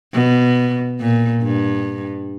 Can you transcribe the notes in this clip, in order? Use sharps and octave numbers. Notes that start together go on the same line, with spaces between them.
B2
A#2
G2